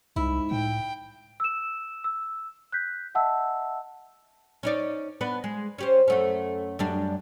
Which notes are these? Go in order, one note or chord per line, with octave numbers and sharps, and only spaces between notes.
C2 G#2 E4
A2 G5
E6 E7
E6
F#6 G6 B6
D#5 E5 F#5 A5 E6
C#4 D#4 D5
B3 D4 B4
G#3
C#4 G4 C5
F#2 A3 C#4
F#2 G3 D4